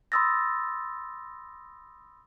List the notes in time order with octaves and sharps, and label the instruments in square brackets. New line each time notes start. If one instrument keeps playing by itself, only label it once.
[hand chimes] B5 C6 D#6 E6 A6 A#6